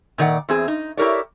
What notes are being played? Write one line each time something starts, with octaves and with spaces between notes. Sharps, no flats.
A#2 D#3 D5 F#5
E2 C4 G#4
D#4
E4 G4 A#4 C#5 D5